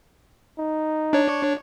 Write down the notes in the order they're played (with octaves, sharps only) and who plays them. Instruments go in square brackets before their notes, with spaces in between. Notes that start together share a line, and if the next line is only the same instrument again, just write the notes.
[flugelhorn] D#4
[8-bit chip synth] D4 C#5